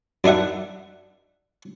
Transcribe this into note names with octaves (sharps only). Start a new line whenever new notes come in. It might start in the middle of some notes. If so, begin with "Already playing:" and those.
F#2 D4 D#4 E5 F#5